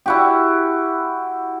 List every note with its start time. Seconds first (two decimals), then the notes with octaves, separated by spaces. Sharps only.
0.06 E4 F#4 G4